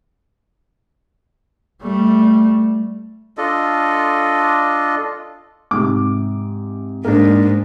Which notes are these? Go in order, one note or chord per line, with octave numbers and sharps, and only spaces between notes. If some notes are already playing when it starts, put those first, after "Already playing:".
G3 A3
D4 F4 A4 D#5
G#2 C3 D6
G#2 A#3 D4